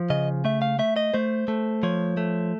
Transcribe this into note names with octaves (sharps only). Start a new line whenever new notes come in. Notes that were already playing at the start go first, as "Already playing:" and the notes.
Already playing: F3
C#3 D#5
A3 E5
F5
A3 E5
D#5
A3 C5
A3
F3 C#5
A3